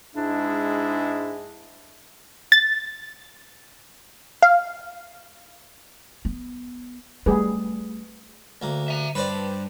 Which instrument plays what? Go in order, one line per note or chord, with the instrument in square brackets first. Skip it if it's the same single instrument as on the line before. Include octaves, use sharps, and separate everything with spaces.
[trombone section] G#2 G#3 E4 [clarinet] D4
[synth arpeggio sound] A6
F5
[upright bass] B3
[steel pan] G3 G#4 B4 [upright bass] A3
[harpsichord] D2 A#3
[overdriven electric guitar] E5 A#5
[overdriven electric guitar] G2 [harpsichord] B4 C5 D5